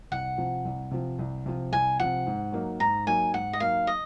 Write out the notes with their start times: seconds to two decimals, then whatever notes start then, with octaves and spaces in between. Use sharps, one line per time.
0.12 C2 F#5
0.38 C3 F3
0.65 C2
0.91 C3 F3
1.19 C2
1.46 C3 F3
1.72 C2 G#5
2.00 C3 F3 F#5
2.27 G#2
2.53 F#3 A#3 D#4
2.80 G#2 A#5
3.07 F#3 A#3 D#4 G#5
3.33 G#2 F#5
3.53 D#5
3.60 F#3 A#3 D#4 F5
3.87 D#5